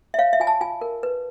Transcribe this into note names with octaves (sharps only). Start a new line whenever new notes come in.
E5
C#5 F5
E5
F4 G#5
A5
F4 G#5
A#4
B4